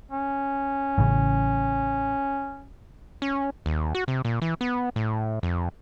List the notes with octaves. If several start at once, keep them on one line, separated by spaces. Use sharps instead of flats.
C#4
A1 A2 C#3
C#4
D#2
F#4
C3
A#2
E3
B3
A2
F2